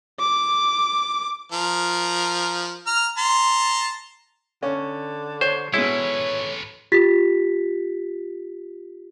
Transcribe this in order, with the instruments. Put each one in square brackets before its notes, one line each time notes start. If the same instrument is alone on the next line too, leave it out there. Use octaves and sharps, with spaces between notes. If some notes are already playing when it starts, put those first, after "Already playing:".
[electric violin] D6
[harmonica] F3 A#4
A#5 F6
A5 A#5 C6
[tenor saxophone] D3 [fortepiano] C#4
[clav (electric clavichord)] C5 [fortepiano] C#5
[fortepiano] B2 G#3 [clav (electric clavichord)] E4 [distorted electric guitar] A4 B4 [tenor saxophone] C#5
[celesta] F4 G4 A6 B6